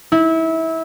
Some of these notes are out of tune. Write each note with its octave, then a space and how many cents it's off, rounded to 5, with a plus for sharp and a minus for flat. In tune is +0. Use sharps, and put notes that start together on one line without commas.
E4 -25